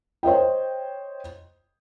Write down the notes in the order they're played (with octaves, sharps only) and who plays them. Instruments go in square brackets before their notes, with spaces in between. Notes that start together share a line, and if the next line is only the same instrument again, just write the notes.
[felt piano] C5 C#5 D#5 G5